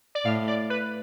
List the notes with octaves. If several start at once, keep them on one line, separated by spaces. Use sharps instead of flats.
D5
A2 F5
D5
B4